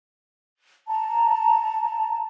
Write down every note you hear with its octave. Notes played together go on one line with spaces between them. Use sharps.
A5 A#5